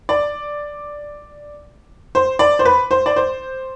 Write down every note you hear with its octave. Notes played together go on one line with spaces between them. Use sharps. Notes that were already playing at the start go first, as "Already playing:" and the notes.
D5
C5
D5
C5
B4
C5
D5
C5